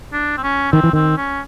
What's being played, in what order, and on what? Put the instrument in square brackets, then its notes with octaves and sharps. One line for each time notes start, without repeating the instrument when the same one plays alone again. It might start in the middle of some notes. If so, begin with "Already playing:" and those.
[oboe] D4
C4
C#4
[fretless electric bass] D#3 [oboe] C4
[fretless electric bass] E3
[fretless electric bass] D#3 [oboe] C4
[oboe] C#4